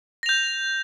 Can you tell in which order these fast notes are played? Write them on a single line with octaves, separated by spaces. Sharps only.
A#6 F7 G6